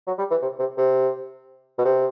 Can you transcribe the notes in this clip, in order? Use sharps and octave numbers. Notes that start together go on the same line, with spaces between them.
F#3
G3
E3
C3
C3
C3
B2
C3